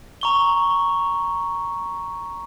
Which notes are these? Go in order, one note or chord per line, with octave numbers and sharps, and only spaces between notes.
A#5 C#6 G7